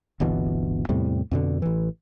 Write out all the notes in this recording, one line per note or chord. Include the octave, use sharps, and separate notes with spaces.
D1 G1 B2 E3
E2 A2 C3 G3
F2 B2 D3
A1 E3